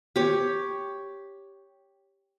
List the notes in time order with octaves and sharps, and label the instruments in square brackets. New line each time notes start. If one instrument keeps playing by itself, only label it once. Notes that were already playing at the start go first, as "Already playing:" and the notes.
[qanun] G4 C#5